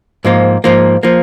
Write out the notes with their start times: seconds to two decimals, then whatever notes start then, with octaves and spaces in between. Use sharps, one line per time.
0.25 G#2 F3 A#3
0.64 G#2 F3 A#3
1.03 F3 A#3